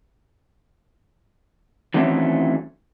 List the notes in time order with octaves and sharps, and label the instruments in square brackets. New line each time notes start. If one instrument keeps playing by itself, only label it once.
[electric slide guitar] D#3 E3 F#3 A3 C4 C#4